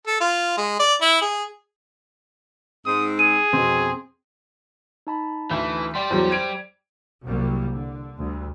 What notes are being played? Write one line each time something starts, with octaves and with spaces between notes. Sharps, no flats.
A4
F4
G#3
D5
E4
G#4
G#2 C4 D#6
G#4 D#7
F2 B2 C4
D#4 A5 B5
D2 E3
G3 G4 D5 G5 C6
E2 F#3 C5
G#6 D7 F7
C2 F#3 G3 A#3
D3
D2 G3